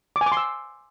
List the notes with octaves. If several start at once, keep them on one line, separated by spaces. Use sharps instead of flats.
D6
G#5
D6
C6
E6